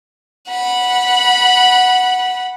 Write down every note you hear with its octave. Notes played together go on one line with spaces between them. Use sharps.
F#5 B5